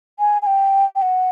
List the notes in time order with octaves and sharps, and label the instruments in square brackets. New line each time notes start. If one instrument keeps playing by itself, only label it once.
[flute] G#5
G#5
G5
G5
F#5